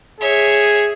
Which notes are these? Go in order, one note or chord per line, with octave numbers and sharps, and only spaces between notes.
G#4 C#5 E5